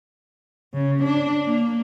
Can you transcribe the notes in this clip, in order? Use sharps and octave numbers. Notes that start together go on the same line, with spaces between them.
C#3
D4
A#3